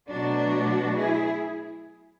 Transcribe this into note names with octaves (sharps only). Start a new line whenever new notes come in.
B2 F#3 A3 D4 F#4
E4 G#4